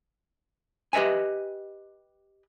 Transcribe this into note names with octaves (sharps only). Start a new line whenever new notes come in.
G4 B4 D#5 E5 G#5